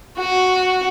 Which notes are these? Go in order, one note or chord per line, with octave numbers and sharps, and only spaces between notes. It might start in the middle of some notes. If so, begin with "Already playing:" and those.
F#4